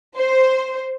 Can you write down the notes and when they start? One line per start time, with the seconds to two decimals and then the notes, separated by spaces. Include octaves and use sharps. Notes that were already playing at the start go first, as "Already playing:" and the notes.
0.17 C5